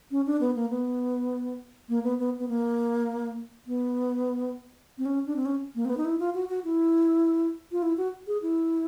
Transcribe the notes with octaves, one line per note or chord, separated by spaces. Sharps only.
C#4
D4
B3
A#3
B3
A#3
B3
B3
B3
A#3
B3
C4
C#4
D4
C4
C#4
A#3
C4
B3
D#4
E4
F4
F#4
F#4
E4
F4
E4
F#4
G#4
E4